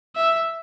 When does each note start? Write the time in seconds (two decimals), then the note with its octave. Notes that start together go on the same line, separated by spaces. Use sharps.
0.16 E5